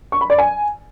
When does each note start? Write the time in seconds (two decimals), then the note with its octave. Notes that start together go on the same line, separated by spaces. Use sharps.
0.12 C#6
0.21 B5
0.30 D5
0.38 G#5